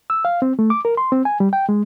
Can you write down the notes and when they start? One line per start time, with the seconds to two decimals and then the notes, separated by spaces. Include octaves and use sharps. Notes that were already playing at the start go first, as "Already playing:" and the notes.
0.10 E6
0.25 F5
0.42 C4
0.59 A3
0.70 D6
0.85 A#4
0.97 C6
1.12 C4
1.25 G#5
1.40 G3
1.53 G5
1.69 G#3